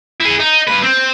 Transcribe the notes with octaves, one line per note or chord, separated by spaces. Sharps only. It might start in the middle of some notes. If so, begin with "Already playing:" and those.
E4 G#4
D#4
G2 B4
C4